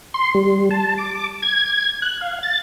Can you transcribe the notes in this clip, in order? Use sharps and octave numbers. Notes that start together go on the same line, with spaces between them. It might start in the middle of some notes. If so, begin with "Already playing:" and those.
C6
G3
A5
D6
G#6
F#6
F5
A6